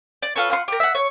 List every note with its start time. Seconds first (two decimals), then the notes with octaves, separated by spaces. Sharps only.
0.23 D5
0.36 F4 A4 B4 C#5
0.50 F4 F#5 C6
0.68 G4 A#4
0.80 E5 F#5
0.95 C#5